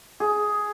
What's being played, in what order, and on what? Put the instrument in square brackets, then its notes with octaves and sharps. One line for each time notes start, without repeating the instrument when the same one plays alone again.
[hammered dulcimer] G#4